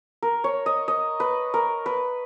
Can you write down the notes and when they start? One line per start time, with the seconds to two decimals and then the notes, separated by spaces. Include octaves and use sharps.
0.23 A#4
0.44 C#5
0.66 D#5
0.88 D#5
1.20 B4
1.54 A#4
1.86 B4